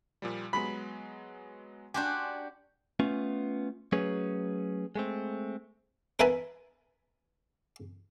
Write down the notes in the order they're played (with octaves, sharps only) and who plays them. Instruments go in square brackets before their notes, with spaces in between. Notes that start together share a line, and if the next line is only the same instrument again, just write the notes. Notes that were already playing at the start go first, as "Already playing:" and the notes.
[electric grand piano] A#2 F3 G3
[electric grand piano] F#3 G#3 B3 [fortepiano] B5
[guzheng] D4 F#4 G4 [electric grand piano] G#5 C6 G6
[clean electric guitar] A3 B3 C#4 F4
F#3 A3 C#4 G#4 B4 C#5
G#3 A3 C4
[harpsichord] A#4 B4 E5 G#5 A5 B5